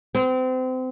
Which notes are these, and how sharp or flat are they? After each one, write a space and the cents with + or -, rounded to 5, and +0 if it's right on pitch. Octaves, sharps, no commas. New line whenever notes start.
C4 -30